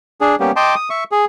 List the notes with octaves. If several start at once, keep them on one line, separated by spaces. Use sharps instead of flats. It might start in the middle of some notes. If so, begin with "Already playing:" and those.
D4 G#4
G3 A#3 B3 C#4 G4
D#5 G5 A5 C6 D6
D#6
E5 C#6
G#4